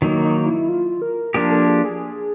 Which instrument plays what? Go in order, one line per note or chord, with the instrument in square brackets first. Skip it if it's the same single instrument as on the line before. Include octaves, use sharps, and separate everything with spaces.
[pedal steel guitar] D#3 F#3 A#3 [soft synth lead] D#4
[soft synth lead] D#4
E4
F4
A#4
[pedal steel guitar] F3 A#3 D4 G4 [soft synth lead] A#4
[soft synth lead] A4
G#4
G#4